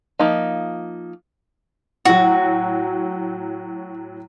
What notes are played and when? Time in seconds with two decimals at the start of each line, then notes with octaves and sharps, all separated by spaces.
0.19 F3 A#3 D#4
2.05 A2 F#3 F#4